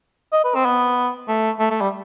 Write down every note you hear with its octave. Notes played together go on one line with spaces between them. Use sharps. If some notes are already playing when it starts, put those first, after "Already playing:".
D#5
B4
C4
B3
A3
A3
A3
G3